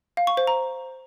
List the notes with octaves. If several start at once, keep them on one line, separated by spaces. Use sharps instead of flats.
F5
C#6
C5
A#5